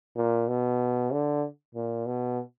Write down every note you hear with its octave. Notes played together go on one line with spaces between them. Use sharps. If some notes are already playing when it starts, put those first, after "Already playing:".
A#2
B2
D3
A#2
B2